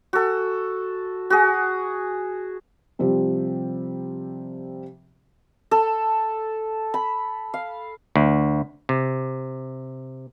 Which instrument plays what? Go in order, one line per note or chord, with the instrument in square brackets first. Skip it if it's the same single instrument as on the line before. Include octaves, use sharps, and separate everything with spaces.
[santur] F#4 A4
F#4 G#4
[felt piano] C3 F3 G3 C4
[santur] A4
B5
F5
[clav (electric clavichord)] D2
C3